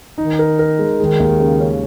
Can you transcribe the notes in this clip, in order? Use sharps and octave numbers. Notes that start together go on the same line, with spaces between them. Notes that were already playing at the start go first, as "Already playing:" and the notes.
D#3 D#4
A#4
A#4
G#3
D#3 G#3
D#2
C#3
C#4